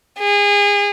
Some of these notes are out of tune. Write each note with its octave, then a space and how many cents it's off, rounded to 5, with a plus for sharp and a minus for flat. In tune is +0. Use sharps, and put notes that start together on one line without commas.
G#4 -30